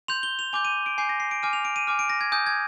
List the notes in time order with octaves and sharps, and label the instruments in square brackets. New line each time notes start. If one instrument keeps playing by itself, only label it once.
[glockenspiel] C6 G6 F7
G7
F7
G#5 D6 G6 F7
D#7
D7
G#5 D6 G6 C7
A#6
C7
D7
G#5 D6 F6 D#7
F7
D7
D#7
G#5 D6 F6
D7
A#6
G#6
G#5 D#6 G6
G#6